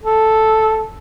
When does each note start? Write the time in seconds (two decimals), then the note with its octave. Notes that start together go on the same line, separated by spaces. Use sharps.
0.03 A4